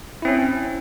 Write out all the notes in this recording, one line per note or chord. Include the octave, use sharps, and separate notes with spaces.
C4 C#4 E4